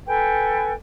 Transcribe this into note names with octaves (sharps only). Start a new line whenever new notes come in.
A4 B4 G5 G#5